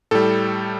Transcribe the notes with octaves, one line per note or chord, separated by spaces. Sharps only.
A2 G3 A4